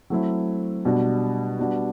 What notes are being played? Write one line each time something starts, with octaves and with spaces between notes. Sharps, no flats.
F#3 A3 C4 E4
B2 G3 D4 F#4
G3 B3 D4 F#4